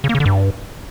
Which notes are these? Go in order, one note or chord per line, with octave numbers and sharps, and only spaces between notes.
C#3
A#3
C#3
D3
G2